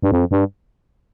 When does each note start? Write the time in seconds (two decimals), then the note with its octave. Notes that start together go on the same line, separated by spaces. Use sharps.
0.02 G2
0.11 F2
0.31 G2